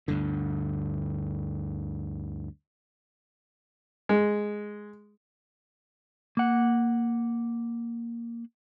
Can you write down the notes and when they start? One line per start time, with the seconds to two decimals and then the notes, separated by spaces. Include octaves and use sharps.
0.08 D2 G2 D3
4.09 G#3
6.37 A#3 F#5